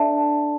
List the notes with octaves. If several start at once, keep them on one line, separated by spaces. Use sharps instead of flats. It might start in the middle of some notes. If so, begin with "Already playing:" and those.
Already playing: D4 A4 D5 E5 A5